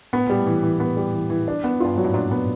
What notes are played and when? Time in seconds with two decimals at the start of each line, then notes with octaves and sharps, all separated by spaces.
0.13 A2 B3
0.27 A#2 G3
0.39 A2
0.46 E3
0.63 E3
0.80 B3
0.97 G3
1.14 E3
1.30 E3
1.48 D4
1.64 B3
1.80 G2 F4
1.95 G#2 F#3
2.04 A2
2.14 A#2 D4
2.31 B3